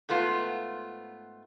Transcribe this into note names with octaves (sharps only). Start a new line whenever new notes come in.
G#2 A3 B3 F4